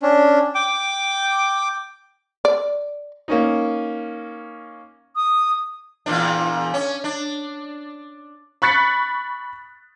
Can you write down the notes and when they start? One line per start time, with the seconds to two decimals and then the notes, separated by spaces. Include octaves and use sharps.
0.02 C#4 D4
0.55 G5 D6
2.45 D5
3.28 A#3 C#4 D#4
5.16 D#6
6.06 E2 A#2 D4
6.74 C#4
7.04 D4
8.62 B5 C#6 F#6 A6 B6 C#7